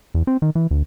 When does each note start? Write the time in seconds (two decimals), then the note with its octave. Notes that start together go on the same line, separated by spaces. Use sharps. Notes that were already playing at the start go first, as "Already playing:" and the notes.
0.14 E2
0.27 C4
0.42 D#3
0.55 E3
0.71 D2